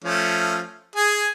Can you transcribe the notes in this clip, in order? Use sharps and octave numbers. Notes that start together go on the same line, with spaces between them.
F3 A3 C#4
G#4 G#5